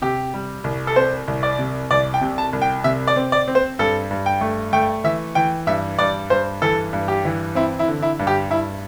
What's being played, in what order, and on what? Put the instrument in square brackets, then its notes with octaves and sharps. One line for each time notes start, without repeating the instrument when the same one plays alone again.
[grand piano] C3 G4
G3
C2
A4
C4 C5
C2
D5
C3
C2 D5
G5
C3
A5
C2
G5
C3 E5
D5
C4
D5
C4
C5
G2 A4
G2
G5
A3
A3 G5
E3 E5
E3 G5
G2 E5
G2 D5
G2 C5
E3 A4
G2
G4
E3
C4 E4
E4
D3
E4
G2
G4
G2 E4